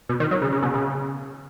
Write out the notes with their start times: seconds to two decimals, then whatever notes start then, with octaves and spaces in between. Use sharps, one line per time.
0.09 B2
0.20 D#3
0.31 F#3
0.42 C#3
0.52 C#3
0.63 B2
0.74 C#3